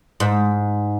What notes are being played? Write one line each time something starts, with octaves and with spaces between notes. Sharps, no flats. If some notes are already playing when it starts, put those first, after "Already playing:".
G#2